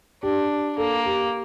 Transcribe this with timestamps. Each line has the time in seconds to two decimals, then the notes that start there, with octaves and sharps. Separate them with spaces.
0.23 D4 G4
0.78 A#3 A4
1.06 G4